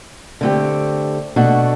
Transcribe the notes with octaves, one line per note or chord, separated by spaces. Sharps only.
D3 A3 C4 G4
B2 A3 D4 F#4